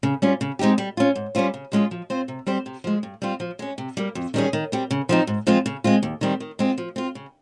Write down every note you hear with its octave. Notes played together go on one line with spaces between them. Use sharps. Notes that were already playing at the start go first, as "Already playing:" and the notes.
C#3
G3 C#4 F4
C#3
G#3 C4 D#4 G4
G3
C#4 F4
G#2
G3 C#4 F4 C5
C#3
F3 G#3 C#4 F4
F3
C4 F4 C5
C3
G3 C4 G4 C5
C3
F3 G#3
G2
G3 C4 F4
F3
G#3 C#4
C3
G3 A#3
F2
D#3 G3 C#4 G#4
D#3
G3 C4
C#3
F3 C4 D#4
G#2
F3 G#3 C4 F4
C#3
G#3 C4 F4
D#2
D#3 G3 C4
D#3
G#3 C4 F4
F3
C4 F4
C#3